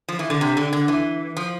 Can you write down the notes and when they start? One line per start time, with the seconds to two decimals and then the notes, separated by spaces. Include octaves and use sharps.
0.08 F3
0.19 E3
0.30 D3
0.41 C3
0.57 D3
0.73 D3
0.88 E3
1.37 F3